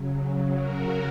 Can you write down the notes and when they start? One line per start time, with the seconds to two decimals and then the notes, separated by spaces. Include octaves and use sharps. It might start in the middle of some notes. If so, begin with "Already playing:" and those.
Already playing: C#3 F#3
0.54 F#4 A#4